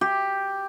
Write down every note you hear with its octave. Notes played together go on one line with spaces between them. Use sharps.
G4